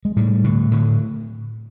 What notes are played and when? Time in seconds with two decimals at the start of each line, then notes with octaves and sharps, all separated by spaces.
0.05 G#3
0.16 A2 G3
0.44 A2 D3
0.71 A2 D3